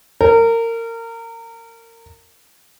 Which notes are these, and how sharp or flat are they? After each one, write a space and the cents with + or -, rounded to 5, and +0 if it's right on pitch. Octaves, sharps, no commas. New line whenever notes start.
A#4 -25